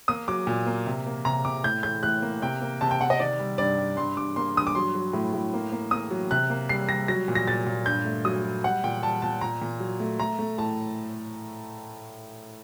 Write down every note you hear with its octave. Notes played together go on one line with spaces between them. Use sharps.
A#3 D#6
F#3 D6
A#2
A#3
C3
A#3
C3 A#5
C3 D6
A2 G6
A2 G6
A2 F#6
A#3
C3 G5
A#3
C3 A5
G5
C3 F#5
D#5
D#3 D5
G3
G2 D5
G3
G2 C6
G2 D6
A#3 C6
G2 D#6
D6
F#3 C6
F#3
A2
A2
A#3
A#3
A#3 D#6
F#3
C3 F#6
A#3
G3 C7
G3 A#6
F#3 A#6
A#2
A#6
A#2 A6
A#2
G2 G6
A3
F#3 D#6
F#3
G3 F#5
A#2 G5
G3 A5
A#2 A5
A#2 A#5
A#2
F#3
A3
A3 A#5
A3
A2 A5